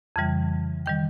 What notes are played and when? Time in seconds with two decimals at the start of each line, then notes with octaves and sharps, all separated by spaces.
0.16 F2 C#3 E3 G3
0.86 D#3 G3 G5